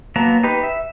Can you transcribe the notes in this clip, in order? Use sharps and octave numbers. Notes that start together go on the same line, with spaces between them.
F#3 A#3 B3 A5 A#5
D#4 G4 B4
E5